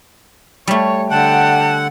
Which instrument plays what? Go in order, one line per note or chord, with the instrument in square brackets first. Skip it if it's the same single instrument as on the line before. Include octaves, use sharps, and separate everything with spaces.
[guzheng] G3 A3 [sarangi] C#5
[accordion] D3 F#5 [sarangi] G5 [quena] A5